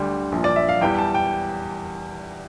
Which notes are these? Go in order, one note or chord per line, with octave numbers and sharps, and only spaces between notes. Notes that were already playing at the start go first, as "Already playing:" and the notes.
Already playing: D2 D3 G3
A#1 A#2 F3
D5
E5
F5
E2 E3 G3 G5
A5
G5